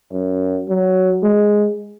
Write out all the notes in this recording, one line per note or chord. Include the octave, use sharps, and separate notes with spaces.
F#2
F#3
G#3